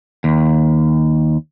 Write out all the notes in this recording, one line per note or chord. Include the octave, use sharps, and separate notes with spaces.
D#2